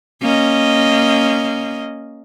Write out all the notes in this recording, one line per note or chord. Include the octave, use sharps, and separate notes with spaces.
A#3 C#4 D#5